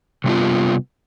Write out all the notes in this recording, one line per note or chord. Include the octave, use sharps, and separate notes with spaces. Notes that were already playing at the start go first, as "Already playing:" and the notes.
C3 G3 B3 F4